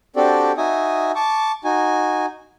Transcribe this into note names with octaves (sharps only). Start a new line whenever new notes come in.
C4 D4 F#4 G4 A4 D5
D#4 F#4 E5 G#5 D#6
A5 C#6 D6
D#4 F#4 G#5